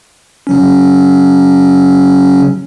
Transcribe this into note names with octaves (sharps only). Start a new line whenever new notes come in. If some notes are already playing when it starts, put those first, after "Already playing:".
C#3 F#3 C#4